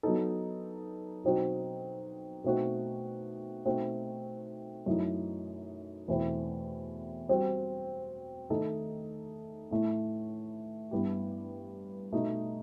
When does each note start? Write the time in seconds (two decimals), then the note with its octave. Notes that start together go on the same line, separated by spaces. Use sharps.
0.03 F#3 B3 D#4 A4
1.24 B2 F#3 C4 D#4 F#4
2.44 B2 A3 C4 D#4 F#4
3.66 B2 A3 C4 D#4 F#4
4.86 F#2 E3 A3 D#4
6.08 E2 B2 A3 C4 E4
7.29 G3 C4 F#4
8.50 D#3 A3 D#4 A4
9.71 A2 E3 A3
10.91 G2 E3 B3 E4 G4
12.12 B2 A3 D#4